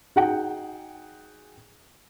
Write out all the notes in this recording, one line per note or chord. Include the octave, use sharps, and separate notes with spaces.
D#4 F#4 G#4 F#5 G5